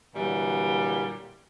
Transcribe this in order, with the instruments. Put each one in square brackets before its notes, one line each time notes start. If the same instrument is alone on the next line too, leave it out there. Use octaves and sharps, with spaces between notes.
[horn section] A#2 D3 E3 F#3 G3